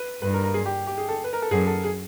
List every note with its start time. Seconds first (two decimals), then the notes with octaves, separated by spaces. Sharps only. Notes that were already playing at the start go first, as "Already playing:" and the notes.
Already playing: B4
0.22 G2 B4
0.34 A#4
0.44 A#4
0.54 G#4
0.66 G4
0.87 G4
0.98 G#4
1.09 A4
1.24 B4
1.33 A#4
1.42 A4
1.51 F#2 G#4
1.67 A4
1.84 G#4